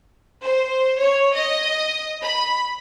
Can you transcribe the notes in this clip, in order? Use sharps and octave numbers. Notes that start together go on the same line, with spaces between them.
C5
C#5
D#5
B5